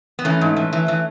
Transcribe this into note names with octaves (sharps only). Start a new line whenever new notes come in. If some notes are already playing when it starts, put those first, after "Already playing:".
B3
E3 A3 C#4
G#2
E3
E3
E3